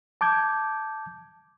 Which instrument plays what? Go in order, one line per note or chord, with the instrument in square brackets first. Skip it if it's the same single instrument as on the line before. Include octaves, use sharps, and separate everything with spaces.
[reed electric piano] A5 D6 G6 G#6